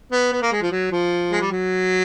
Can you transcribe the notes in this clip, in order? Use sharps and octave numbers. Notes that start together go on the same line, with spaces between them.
B3
B3
A#3
G#3
F3
F#3
F3
G#3
G3
F#3